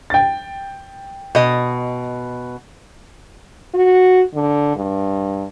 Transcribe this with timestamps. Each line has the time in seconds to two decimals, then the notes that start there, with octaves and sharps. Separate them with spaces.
0.10 G5 A6
1.35 B2 D#5
3.74 F#4
4.35 D3
4.76 G2